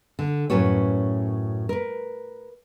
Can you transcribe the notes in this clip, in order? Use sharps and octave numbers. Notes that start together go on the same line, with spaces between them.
D3
F#2 A2 C#4 F#4 B4 C#5
A#4 B4